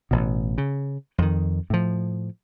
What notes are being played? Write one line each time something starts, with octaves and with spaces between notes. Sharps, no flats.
A1 B2
C#3
F2 D#3
A2 F3